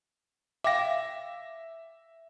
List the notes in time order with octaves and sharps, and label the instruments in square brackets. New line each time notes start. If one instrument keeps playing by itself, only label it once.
[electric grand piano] E5 A#6 [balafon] F5 G5 D6